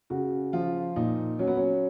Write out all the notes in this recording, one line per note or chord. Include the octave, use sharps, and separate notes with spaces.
C#3 F#4
F3 F4
A#2 D#4
F#3 C#4
B3
C#4